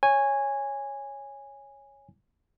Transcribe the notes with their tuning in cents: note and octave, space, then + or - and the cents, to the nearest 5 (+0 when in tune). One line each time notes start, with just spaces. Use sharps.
C#5 +0 G#5 -10